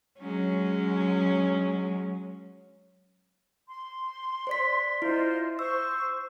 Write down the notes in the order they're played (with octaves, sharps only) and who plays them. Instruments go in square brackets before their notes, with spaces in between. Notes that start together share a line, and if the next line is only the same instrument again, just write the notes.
[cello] F#3 G#3 [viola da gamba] C#4
[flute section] C6
[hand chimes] C5 D5 B6
[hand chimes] E4 [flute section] F4 C5 D#5
[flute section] C5 C#6 [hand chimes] E6